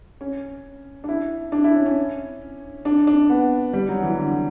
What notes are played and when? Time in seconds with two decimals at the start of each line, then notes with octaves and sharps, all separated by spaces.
0.21 C#4
1.04 D4
1.09 E4
1.52 D4
1.64 E4
1.75 C#4
1.86 C#4
2.85 D4
3.07 D4
3.30 B3
3.73 G3
3.89 F#3
4.03 E3
4.17 D3